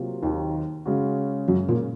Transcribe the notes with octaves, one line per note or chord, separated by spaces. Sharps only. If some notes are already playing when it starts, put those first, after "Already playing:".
Already playing: C3 F#3 A#3 F4
D#2 D#3
C#3 G#3 C#4 F#4
F#2 F#3
A#2 A#3